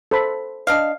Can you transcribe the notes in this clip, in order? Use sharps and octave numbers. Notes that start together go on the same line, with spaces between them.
A4 C5 B5
D4 D#5 F5